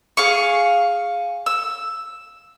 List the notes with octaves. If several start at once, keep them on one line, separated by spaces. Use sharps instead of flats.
G#4 F5 C#6
E6